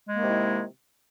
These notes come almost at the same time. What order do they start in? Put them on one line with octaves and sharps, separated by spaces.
G#3 A#3 D#3 C3 E4